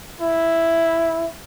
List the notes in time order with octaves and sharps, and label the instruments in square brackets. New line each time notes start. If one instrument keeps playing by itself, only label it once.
[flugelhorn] E4